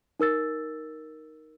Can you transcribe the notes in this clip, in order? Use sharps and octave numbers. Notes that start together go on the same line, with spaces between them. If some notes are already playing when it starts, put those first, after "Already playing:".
D#4 A#4 E6 A6